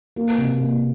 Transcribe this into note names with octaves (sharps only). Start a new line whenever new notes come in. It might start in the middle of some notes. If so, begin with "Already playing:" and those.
A#3
C3
A#3